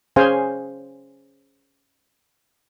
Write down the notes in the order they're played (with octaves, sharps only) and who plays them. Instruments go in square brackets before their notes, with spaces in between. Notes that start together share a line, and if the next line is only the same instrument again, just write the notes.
[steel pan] C#4 G#4 C5 F5 G#5